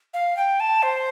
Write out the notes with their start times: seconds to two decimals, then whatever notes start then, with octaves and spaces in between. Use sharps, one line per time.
0.14 F5
0.37 G5
0.60 A5
0.82 C5